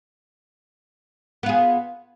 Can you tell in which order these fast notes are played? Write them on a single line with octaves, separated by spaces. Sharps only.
B3 F4 G#4